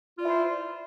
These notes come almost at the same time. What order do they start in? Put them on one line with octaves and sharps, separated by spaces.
F4 D5 E4 C5